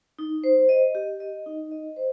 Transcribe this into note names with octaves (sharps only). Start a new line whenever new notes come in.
D#4
C5
D#5
G4
D#5
D#4
D#5
C5